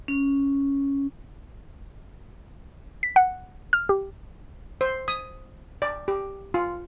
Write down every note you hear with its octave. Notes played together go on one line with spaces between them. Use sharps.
C#4
B6
F#5
F6
G4
C5
D#6
D5
G4
F4